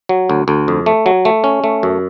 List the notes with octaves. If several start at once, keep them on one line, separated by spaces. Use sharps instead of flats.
F#3
D2
D2
F2
A3
F#3
A3
C#4
A3
F#2